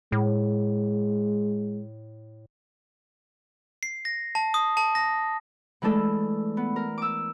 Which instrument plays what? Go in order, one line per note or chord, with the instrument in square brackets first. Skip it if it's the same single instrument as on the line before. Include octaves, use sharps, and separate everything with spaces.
[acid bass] A2 [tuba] G#3
[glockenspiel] C7
A#6
A5
D#6
A5
A#6
[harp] E3 G#3 A3 D4 A4
B3
A#4
D6 E6